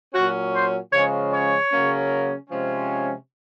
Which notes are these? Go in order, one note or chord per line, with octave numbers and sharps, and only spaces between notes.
A#2 F#3 C#4 F#4
C5
C#3 F3 G#3 C#4 C#5
C#5
C#3 F#3 A#3 C#4
C3 F3 G#3 C#4